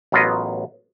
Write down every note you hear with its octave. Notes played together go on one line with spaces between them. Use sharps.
A1 F#3 B3 F4 A#4 D#5